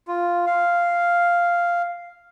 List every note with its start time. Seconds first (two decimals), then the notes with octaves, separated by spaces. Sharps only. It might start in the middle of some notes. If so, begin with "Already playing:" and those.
0.08 F4
0.46 F5